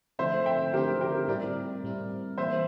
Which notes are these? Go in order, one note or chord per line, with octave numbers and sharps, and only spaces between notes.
D3 F3 A3 C4 E4 C5 E5
E5 G5
D3 F3 A3 C4 E4 G4 A#4
G4 A#4
A2 G3 C4 E4 A#4 D5
A2 G3 C4 E4
E3 A#3 E4 C5 E5